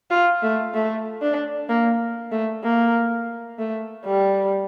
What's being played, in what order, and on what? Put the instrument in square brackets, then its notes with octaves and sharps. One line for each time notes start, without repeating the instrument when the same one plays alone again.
[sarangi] F4
A3
A3
D4
A#3
A3
A#3
A3
G3